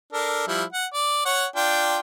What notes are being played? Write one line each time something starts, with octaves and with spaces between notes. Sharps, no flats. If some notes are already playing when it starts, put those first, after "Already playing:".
D4 A4 A#4
F3 G3 E4
F#5
D5
C#5 F#5
D4 F4 G5